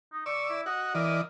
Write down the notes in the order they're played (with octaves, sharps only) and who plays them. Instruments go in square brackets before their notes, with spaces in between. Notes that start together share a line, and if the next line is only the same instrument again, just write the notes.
[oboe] D#4
[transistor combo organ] D5 E6 [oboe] C#6
[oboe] E4
[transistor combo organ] F#4 [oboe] D#5
[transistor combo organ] E3 D5 D#5 [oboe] A#4